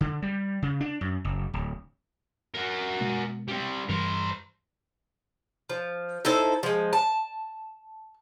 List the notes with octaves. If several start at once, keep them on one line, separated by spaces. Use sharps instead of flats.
D3
G3
C#3
D4
F#2
F#1
D1
F#4 A#4
B2 G#3 A#3
G3 C4
G2 E3 G3 A#4 C5
F3
D#4 E4 A4 C5
F3 G#3
A5